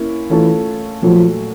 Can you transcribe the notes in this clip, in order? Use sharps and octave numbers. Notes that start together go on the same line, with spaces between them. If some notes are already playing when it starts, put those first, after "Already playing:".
Already playing: A#3 C#4 E4
E3 A3 C#4 F4 A4
A#2 F3 F#3 A3